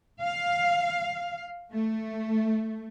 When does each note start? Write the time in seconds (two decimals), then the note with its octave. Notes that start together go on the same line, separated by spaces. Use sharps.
0.22 F5
1.72 A3